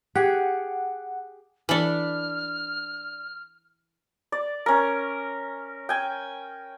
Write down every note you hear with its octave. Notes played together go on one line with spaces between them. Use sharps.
G4 G#4 F#5
E3 D4 A4 B5 F6
D5
C#4 A#4
G5 G#5